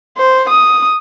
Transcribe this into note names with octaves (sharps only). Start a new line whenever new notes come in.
C5
D#6